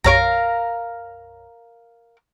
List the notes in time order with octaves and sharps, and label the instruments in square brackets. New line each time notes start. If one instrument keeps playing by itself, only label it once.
[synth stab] B1 F#2 C#5 [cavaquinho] A#4 F5 A#5